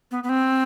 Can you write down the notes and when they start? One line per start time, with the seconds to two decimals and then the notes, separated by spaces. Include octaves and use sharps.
0.11 B3
0.24 B3
0.29 C4